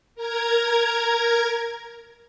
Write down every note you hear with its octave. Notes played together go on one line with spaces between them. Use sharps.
A#4 A#5 G#6